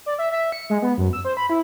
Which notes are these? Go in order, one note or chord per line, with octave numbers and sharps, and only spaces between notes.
D5
E5
E5
C#7
G#3
B3
F#2
E6
C5
B5
E4